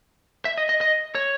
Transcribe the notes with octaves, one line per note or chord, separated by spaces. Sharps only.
E5
D#5
D#5
D#5
C#5